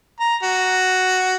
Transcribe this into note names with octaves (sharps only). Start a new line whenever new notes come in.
A#5
F#4